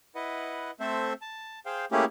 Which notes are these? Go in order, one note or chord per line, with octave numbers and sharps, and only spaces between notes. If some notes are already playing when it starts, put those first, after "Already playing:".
E4 B4 D#5 F#5
A3 C4 A4 C5 E5
A5
G#4 C5 F5 G5
A3 A#3 C#4 E4 G4 G#4